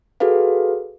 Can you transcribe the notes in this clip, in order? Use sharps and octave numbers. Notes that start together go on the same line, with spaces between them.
F#4 G#4 A4 B4 F5